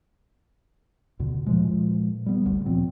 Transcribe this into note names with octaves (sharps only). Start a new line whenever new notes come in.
D2 B2 D3
A#2 F3 G#3
G3 B3
G#1 D2
A#2 F3 B3 C4